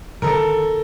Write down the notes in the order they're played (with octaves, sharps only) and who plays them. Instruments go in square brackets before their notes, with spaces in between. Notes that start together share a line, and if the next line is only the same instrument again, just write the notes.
[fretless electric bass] D3 D#3 [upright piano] A4 A#4